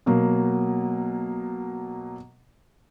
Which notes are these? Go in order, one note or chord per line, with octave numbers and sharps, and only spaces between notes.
B2 F#3 A#3